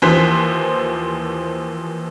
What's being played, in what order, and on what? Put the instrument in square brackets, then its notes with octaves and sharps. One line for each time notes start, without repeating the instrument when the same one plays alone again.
[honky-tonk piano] D#2 E3 F3 C5 F#6 B6